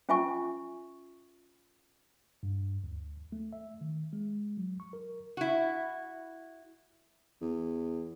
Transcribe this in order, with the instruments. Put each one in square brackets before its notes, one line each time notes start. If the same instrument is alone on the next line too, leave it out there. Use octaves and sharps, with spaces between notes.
[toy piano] C#4 F4 E5 G#5 C#6
[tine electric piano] G2
D2
A3
E5
D#3
G#3
F#3
C#6
A#4
[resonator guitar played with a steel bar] E4 F#4
[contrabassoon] E2